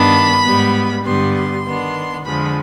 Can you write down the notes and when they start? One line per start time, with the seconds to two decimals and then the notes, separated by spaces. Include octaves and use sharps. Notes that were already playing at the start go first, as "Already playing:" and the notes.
Already playing: G2 D#3 B3 D4 B5
0.43 G#2 G3 B3
1.03 G2 D3 G3 B3 C6
1.35 C6
1.65 D#3 B3 D4
2.25 F2 D3 F3 G#3 B5